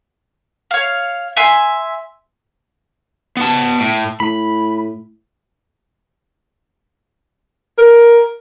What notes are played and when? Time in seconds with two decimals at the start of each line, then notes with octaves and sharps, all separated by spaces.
0.71 C#5 F5
1.37 E5 G#5 C6 E6
3.37 B3 A5
3.80 A2
4.20 A2 B5
7.78 A#4